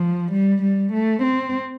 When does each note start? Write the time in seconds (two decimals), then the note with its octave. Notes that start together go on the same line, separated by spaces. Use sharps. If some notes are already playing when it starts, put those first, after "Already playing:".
Already playing: F3
0.32 G3
0.63 G3
0.93 A3
1.23 C4